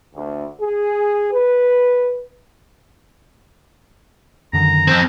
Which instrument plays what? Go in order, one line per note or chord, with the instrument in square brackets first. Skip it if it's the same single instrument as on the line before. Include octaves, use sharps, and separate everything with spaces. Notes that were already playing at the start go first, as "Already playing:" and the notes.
[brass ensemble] D2
G#4
B4
[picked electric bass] F#2 D3 D#3 [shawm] A#5
[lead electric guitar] F2 C4